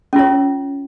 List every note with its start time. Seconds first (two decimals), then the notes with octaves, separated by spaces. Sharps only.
0.13 C#4
0.16 F4
0.19 C#5